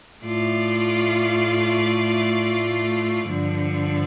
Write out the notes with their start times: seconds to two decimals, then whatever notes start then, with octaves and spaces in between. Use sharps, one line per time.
0.23 A2 A3 F4 D5
3.25 G2 D3 F3